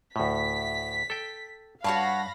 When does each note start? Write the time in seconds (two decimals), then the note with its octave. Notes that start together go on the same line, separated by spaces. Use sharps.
0.16 D2 A2 B6
1.10 A4 G5
1.84 G2 F#4 C#5 F5 A5 B5 A#6